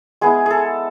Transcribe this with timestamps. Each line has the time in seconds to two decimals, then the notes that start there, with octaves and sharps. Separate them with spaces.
0.21 G#3 B3 E4 G#4
0.46 G#4 A4